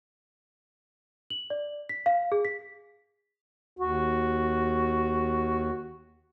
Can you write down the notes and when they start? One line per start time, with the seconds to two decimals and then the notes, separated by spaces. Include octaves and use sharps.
1.30 F#7
1.50 D5
1.89 B6
2.06 F5
2.32 G#4
2.45 B6
3.79 D#2 F#4